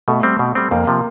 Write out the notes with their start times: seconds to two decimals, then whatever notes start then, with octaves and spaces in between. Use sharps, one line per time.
0.08 B2 A3
0.23 G3 C4
0.39 B2
0.55 G3 C4
0.71 F2 A#3
0.87 C3 F3